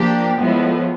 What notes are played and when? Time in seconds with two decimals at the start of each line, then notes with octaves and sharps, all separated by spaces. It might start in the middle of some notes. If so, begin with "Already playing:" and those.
Already playing: F3 A#3 D4 G4
0.39 A2 F3 G#3 B3